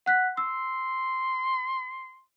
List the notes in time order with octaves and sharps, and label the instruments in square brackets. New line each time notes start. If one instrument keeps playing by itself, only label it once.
[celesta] F#5 F#6 B6
[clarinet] C6 [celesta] E6